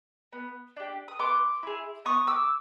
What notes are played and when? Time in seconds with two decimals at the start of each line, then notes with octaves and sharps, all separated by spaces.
0.33 B3
0.77 D4 G4
1.08 D#6
1.19 B3 C6 D6
1.63 E4 G#4
2.05 B3 C#6 D#6
2.27 D6 E6